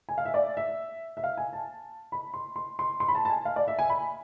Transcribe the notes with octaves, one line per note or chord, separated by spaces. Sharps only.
G#5
F5
E5
D5
E5
E5
F5
G#5
A5
B5
C6
C6
C6
C6
B5
A5
A5
G#5
F5
D5
E5
G#5
B5